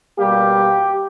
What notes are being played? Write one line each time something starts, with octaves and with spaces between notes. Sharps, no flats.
B2 G3 A#3 G4